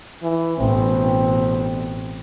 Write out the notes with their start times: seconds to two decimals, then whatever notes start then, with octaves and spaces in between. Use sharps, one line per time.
0.23 E3
0.59 A1 B2 C4